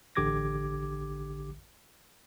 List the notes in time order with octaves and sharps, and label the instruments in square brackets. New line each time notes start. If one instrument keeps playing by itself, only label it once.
[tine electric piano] A1 D3 G4 D6 G#6 A#6